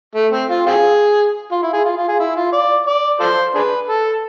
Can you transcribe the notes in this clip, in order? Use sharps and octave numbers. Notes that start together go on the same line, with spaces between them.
A3
C4
F4
C4 F4 G#4
F4
E4
G#4
F4
F4
G#4
E4
F4
D5
D5
F4 A4 C5
D4 G#4 B4
A4